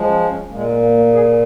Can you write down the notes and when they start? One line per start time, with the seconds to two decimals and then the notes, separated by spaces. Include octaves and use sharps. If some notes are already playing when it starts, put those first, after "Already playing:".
Already playing: F3 G#3
0.09 C#4
0.29 C#4
0.50 A#2 G#3 A#3
0.66 G#3
0.82 A#3
0.97 A#3
1.13 G#4